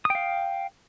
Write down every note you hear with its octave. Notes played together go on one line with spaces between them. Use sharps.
F5 G5 D#6